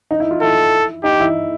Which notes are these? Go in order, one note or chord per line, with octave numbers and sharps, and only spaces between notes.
D#4
E4
F4
E4 A4
D#4 G4
E4